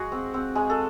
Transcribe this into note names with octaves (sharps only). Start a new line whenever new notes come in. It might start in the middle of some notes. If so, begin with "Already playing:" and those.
Already playing: G#3 F#4 G#4
C4
C4
G#3 G#4
A4